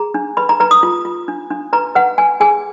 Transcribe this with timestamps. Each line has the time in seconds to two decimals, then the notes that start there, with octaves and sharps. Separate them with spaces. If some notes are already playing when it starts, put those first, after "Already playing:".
Already playing: G#4 A#5
0.14 D4
0.37 B4 B5
0.49 A#5
0.60 B4 A#5
0.71 D#6
0.83 F4
1.05 F4
1.28 D4
1.51 D4
1.73 B4 A#5
1.95 B4 F#5
2.18 B4 G#5
2.40 G#4 G#5